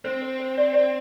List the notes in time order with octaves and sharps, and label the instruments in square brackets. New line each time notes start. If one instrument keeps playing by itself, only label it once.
[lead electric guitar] C4 [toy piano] C5
[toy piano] C5
C5
D5
D5